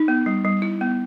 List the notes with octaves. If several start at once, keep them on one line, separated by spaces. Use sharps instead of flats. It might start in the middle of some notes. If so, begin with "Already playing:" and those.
Already playing: D#4
B3
G3
G3
E4
B3